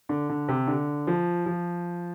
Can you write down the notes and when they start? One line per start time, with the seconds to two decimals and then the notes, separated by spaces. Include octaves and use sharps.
0.09 D3
0.29 D3
0.48 C3
0.67 D3
1.07 F3
1.46 F3